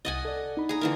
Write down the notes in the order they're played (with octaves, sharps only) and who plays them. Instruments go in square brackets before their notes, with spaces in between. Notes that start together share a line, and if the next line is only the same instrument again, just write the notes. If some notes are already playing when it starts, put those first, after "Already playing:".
[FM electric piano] C2 D#6 A6 [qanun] D#5 F#5 G#5
[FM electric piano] A4 D5
D#4 B5
[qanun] G#4 A#5
D3 E3 A#4